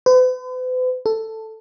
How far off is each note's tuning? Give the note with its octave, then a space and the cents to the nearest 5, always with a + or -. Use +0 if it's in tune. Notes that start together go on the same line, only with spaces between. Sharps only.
B4 +45
A4 +10